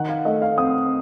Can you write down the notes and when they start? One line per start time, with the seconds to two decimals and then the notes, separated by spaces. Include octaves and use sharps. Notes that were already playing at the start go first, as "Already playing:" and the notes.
Already playing: D#3 F#5
0.09 F5
0.25 A3 D#5
0.42 F5
0.58 C4 D#6